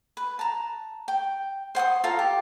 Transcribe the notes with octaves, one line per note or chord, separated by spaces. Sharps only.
B4
A5 A#5
G5
C5 F#5 C6 D#6
F4 A4 F5 A#5
G4